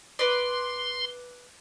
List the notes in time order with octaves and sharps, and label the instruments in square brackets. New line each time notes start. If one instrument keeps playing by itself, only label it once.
[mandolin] B4 D5 [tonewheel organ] C6